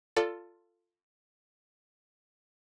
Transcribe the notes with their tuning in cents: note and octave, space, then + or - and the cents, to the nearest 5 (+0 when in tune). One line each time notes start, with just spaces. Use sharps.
F4 +0 A4 +15 D5 -15